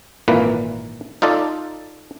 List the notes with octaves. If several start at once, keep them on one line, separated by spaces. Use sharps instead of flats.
G#1 A#2 E3 A#3 B4
D#4 F4 A4 D5